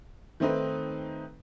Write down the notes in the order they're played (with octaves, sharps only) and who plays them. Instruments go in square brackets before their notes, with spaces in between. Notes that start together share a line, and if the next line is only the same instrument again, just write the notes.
[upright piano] D#3 A3 C4 D#4 B4